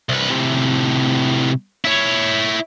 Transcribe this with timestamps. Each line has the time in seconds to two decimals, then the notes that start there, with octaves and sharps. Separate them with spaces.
0.09 C2 B4
0.30 A2 C3
1.85 E4 C#5